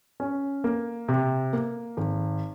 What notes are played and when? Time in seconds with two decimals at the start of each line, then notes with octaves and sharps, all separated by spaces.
0.20 C#4
0.64 A#3
1.08 C3
1.53 A#3
1.97 G#1